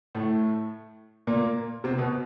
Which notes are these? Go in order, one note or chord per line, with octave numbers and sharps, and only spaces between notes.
A2 A3
A#2 A#3
C3 C4
B2 B3